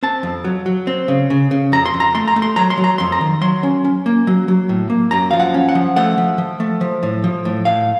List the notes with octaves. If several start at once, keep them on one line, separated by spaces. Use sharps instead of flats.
C4 A5
F2
F#3
F#3
C4
C#3
C#3
C#3
F2 A#5
C6
F2
A#5
A3 C6
A#5
A3
C6
F#3 A#5
C6
F#3
A#5
F2 C6
A#5
D#3
F#3 C6
C#4
C#4
A#3
F#3
F#3
A2
A#3
F#2 A#5
F3 F5
F#5
C#4
F#5
F3
A3 F#5
F3
F3
A3
F3
A2
F3
A2
A2 F5